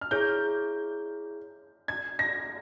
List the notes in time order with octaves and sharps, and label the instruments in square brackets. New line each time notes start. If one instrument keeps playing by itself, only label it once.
[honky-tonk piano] F6
[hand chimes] E4 G#4 C#5 [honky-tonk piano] G6
[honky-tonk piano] G#6
A#6